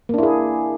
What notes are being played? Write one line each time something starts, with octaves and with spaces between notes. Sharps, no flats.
A#3 D4 E4 G#4